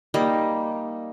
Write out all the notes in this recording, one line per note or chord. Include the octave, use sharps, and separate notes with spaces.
G3 A#3 D#4